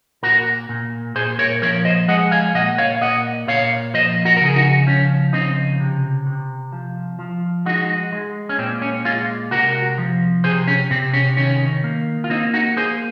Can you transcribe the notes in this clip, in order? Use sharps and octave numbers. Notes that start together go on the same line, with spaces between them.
A#2 F#4 A#4
A#2
A#2 G#4 C5
A#4 C#5
F3 A#4 C#5
C5 D#5
G#3 D#5 F#5
F5 G#5
A#2 D#5 F#5
C#5 F5
A#2 D#5 F#5
A#2 C#5 F5
F3 C5 D#5
F#4 A#4
C#3 A#4
G#4
D#4 F#4
F3 C#4
C#3 C4 D#4
C3
C3
F3
F3
G#3 D#4 F#4
G#3
C#4
A#2 C4
C#4
G#3 C#4 F4
C3 F#4 A#4
F3
C3 G#4 C5
C#4
C3 C4
C#4
D#3 C#4
A#3
F4
A#3 C4 D#4
D#4 F#4
A#3 G#4 C5